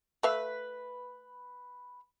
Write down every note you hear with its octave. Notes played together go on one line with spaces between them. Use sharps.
A3 B4 E5 F5